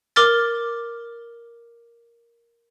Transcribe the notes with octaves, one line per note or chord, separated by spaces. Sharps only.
A#4 D6 F6 A6